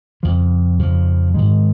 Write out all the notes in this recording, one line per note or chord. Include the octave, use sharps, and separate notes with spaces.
F2 C#3 F3
F2 C#3 F3
G#2 D#3 G#3